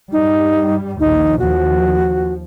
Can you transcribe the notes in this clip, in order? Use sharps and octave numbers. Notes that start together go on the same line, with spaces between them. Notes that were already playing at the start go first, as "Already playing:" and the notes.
G2 G3 D#4
A#1 D#2 D#4
D#2 F3 F#4